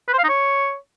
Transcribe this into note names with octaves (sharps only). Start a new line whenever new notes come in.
B4
C5
F5
D#4
C#5